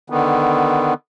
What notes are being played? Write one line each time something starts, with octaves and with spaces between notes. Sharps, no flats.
D3 D#3 B3